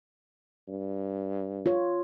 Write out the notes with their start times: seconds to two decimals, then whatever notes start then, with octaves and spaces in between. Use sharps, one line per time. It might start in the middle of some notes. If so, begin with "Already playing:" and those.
0.68 G2
1.66 F4 C#5